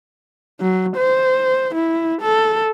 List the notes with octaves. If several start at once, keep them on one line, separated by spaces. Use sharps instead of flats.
F#3
C5
E4
A4